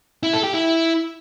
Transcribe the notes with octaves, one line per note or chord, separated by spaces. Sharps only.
E4
A4
G4
E4